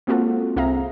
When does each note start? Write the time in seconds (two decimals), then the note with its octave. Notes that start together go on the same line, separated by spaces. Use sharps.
0.07 G#3 A#3 C4 F4 F#4 A4
0.56 C2 C4 G#4 E5 F5 A#5